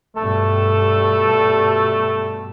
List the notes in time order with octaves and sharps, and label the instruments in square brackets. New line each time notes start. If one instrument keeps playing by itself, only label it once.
[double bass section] G2 B2 G3 [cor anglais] A3 [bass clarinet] A4